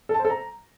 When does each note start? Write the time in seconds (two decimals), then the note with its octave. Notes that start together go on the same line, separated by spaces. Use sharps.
0.09 A4
0.14 A5
0.19 C5
0.25 A4
0.30 A#5